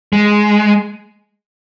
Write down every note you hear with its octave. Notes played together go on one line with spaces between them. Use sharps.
G#3